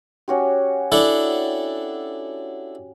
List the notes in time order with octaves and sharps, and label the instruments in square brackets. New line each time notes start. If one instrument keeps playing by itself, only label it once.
[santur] C#4 F#4 G4
[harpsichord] D4 E4 A4